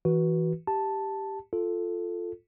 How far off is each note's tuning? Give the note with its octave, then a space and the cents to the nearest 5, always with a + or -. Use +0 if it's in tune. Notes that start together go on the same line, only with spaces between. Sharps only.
E3 -15 F#4 +0 B4 -20
G4 +0 A5 +0
F4 +0 A4 +0